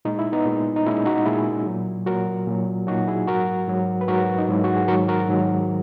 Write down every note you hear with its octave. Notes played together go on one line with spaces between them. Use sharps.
A#2 G#3 D#4
E4
B3 D#4
A#2 G#3
D#4
A#2 G#3 C#4 E4
D#4 F#4
A#2 G#3 E4 G#4
A#2 F#3
A#2 F#3 F#4 A#4
A#2 F#3
A#2 F#3 D#4 F#4
E4 G#4
G#2 F#3 F#4 A#4
G#2 F#3
B4
G#2 F#3 F#4 A#4
D#4
G#2 F#3 E4
F#4
G#4
G#2 D#3 F#3 F#4 A#4
F#4 A#4
G#2 D#3 F#3